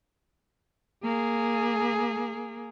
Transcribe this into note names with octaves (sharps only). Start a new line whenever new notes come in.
A#3 G#4